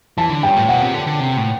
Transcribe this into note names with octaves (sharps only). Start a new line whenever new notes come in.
E3 A5
D3
G2 G5
A2
B2 F#5
C3
D3
D3
C3
A2